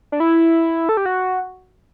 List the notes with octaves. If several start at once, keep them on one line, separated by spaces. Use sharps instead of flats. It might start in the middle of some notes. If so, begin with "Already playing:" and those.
D4
E4
A4
G4
F#4